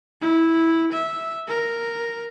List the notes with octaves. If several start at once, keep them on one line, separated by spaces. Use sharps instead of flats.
E4
E5
A#4